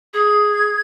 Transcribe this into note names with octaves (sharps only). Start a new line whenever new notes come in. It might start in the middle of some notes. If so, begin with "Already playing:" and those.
G#4 G#6